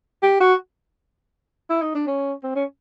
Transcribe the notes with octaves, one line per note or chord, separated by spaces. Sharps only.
G4
F#4
E4
D#4
D4
C#4
C4
C#4